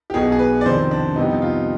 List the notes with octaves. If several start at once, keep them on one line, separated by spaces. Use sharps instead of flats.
G4
B1 B2 B3 G#4
G#4
B4
D5
F2 C3 D#3 C5
D4
F2 C3 G3 B3 D#4
F4